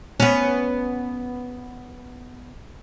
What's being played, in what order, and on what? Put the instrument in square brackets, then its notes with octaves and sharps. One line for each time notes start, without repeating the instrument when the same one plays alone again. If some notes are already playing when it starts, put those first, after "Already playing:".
[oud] B3 C#4